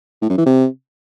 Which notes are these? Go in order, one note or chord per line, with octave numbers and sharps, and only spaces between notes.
A2
F#2
E3
C3